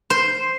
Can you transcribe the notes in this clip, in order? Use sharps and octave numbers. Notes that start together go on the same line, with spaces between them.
C5